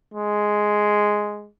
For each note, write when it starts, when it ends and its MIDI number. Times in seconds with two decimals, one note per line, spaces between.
0.14 1.50 56